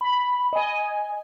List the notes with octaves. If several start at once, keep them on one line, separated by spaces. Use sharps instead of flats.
B5
D#5 G#5